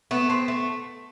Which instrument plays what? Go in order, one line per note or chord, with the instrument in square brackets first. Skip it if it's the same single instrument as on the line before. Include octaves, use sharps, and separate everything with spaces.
[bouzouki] A3 [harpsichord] B3
[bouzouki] C4
A3